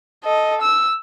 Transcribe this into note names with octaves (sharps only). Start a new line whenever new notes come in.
A4 D#5
E6